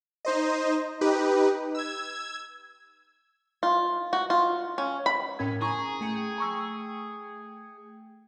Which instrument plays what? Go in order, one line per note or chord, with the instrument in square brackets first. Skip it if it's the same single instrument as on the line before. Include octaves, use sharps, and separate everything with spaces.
[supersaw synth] D#4 C5 D#5
D#4 G4 B4
E6 G#6
[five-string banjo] F4
F#4
F4
C#4
B5
[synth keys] A2 C#4 G#6 [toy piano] A#4 G5
[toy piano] E4 C#6 [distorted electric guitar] G#4 [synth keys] G#5 A#5
[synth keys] A3 G5 C#7
[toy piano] A#5 C#6 E6